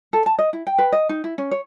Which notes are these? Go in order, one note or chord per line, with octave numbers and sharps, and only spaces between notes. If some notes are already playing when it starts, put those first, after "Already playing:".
A4
A5
D#5
E4
G5
B4
D#5
D#4
E4
C#4
C#5